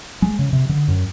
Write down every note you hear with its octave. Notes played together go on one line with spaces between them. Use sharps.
G#3
C#3
C3
D3
F#2